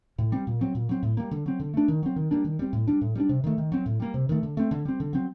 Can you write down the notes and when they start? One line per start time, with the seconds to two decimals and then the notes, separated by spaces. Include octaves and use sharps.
0.18 A2
0.32 G3 C4
0.47 A#2
0.61 F#3 C4
0.75 A#2
0.89 F#3 C4
1.03 A2
1.17 G3 A#3
1.31 D3
1.46 F#3 C4
1.60 D3
1.74 A3 D4
1.88 D#3
2.03 F#3 C4
2.16 D#3
2.31 G3 A#3 D4
2.44 D#3
2.59 G3 C4
2.73 A2
2.87 G3 D4
3.01 A2
3.15 G3 A#3 D4
3.29 C3
3.44 D#3 A3
3.58 D#3
3.72 F#3 C4
3.86 A2
4.00 G3 A#3
4.14 C3
4.29 D#3 A3
4.43 D3
4.57 A3 C4
4.71 D3
4.85 G3 C4
5.00 D3
5.13 F#3 C4